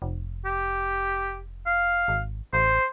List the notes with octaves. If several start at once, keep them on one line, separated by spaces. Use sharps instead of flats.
F1
G4
F5
G#1
A1 C5